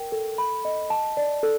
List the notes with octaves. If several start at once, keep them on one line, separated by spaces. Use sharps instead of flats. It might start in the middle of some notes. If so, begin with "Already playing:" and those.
Already playing: A#4 G5
A4
B5
D#5
A5
D5
A4